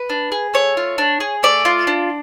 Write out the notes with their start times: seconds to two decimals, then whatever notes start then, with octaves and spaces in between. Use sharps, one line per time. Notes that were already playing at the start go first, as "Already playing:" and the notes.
Already playing: B4
0.10 D4
0.32 G#4
0.54 A3 C#5
0.77 F4
0.98 D4
1.20 G#4
1.43 A3 D5
1.65 F4
1.87 D4